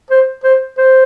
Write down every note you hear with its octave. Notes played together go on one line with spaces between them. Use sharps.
C5
C5
C5